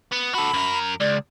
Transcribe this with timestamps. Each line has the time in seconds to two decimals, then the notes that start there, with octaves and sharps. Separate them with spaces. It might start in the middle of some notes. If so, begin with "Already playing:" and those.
0.12 B3
0.34 F#4 A4 B5
0.54 F#2 A#4
1.00 C#2 D5